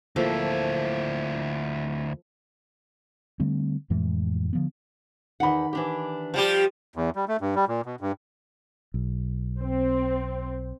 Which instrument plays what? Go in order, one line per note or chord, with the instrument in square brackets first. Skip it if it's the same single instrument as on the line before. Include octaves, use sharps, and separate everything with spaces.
[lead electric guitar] D2 E4 [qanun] F3 A#3 A4
[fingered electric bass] D3 G3 A3 C4
F2 A2 E3 G#3
D3 F3 B3
[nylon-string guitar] E2 F#5 [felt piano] D#3 B5
[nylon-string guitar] E3 D4 G4
[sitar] F3 G3 G4
[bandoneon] E2
G3
A3
G2
G3
A#2
B2
G2
[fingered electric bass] B1
[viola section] C4